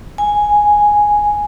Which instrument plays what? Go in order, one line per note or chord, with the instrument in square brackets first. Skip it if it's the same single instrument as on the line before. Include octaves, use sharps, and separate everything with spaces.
[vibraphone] G#5